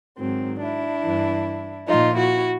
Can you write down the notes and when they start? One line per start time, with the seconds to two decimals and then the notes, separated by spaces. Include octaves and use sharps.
0.19 G#2 D#3 F#3 C4
0.61 D4 E4
1.04 G2 E3
1.88 A#2 F3 D#4 F4
2.16 E4 F#4